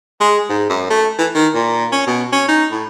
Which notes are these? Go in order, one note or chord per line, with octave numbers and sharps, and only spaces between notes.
G#3
G#2
F#2
A3
E3
D#3
A#2
C#4
B2
C#4
D#4
A2